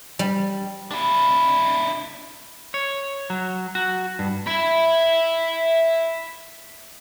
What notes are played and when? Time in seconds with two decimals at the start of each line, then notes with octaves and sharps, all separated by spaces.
0.19 G3
0.91 D4 E4
2.74 C#5
3.30 F#3
3.75 F#4
4.19 G2
4.47 E5 B5